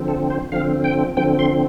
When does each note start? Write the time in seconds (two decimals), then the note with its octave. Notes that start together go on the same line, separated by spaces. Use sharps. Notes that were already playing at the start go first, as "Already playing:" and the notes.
Already playing: D3 F3 C4
0.08 A4
0.30 C5
0.52 D3 F3 C4 F5
0.84 G5
1.17 D3 F3 C4 G5
1.39 C6